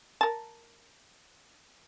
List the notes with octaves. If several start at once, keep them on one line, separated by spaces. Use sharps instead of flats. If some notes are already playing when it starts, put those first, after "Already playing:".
A#4 A5